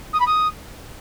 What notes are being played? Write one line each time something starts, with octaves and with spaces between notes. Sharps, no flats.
D#6
B5
D#6